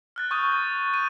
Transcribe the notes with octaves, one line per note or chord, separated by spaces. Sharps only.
F6 F#6 A6
C#6 D#6 G6 D#7
A6
D#7